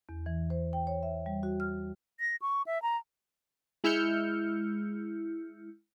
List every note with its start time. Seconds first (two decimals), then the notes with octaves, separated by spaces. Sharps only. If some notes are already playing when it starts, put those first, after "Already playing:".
0.09 E2
0.26 E3
0.50 C5
0.73 G5
0.87 C#5
1.03 E5
1.26 G3
1.43 F#4
1.60 F6
2.20 A#6
2.42 C#6
2.66 E5
2.82 A#5
3.84 G#3 E4 E6 F6 G6 C#7